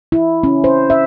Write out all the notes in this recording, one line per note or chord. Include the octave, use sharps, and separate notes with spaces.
E4
C#4
C5
E5